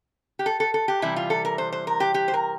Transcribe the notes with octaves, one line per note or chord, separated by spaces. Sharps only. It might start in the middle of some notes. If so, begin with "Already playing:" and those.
G4
A4
A4
A4
G4
C3 E3 G3 E4
F4
A4
A#4
C5
C5
A#4
G4
G4
C5
A#4